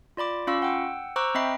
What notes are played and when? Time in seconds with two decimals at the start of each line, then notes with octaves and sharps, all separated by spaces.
0.17 F4 D5 B5 D6
0.47 C#4 F4 F5 B5 C#6 E6
0.62 F#5 G5 E6
1.16 C5 A#5 C#6 D6 E6 F#6
1.35 C4 D#5 E5 G5 B5 C7